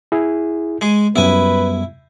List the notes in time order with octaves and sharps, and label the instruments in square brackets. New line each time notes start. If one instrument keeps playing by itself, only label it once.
[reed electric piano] E4 G#4
[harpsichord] G#3 G#4
[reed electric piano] F#2 G3 B3 [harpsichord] E4 G#5 [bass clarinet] B4